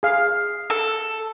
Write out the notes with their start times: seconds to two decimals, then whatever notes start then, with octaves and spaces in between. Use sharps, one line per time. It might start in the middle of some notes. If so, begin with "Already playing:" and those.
0.03 G#4 F5
0.70 A4